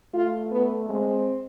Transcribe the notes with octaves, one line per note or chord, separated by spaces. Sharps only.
A3 F4
B3
G#3 C4